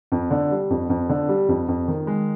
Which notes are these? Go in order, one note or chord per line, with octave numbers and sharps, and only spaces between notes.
F2
D3
G3
F2
F2
D3
G3
F2
F2
D#3
G#3